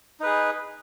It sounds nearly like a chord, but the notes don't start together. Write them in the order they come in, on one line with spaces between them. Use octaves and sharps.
D#4 B4 G#4